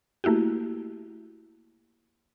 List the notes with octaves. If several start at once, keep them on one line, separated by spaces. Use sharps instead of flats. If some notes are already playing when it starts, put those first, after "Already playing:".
A3 A#3 E4 F#4 G4